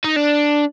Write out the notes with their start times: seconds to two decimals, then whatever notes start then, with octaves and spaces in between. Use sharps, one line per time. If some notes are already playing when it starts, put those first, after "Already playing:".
0.04 D#4
0.16 D4